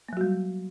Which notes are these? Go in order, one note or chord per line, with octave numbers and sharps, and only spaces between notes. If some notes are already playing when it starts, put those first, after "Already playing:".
F#3 G3 A#3 F#4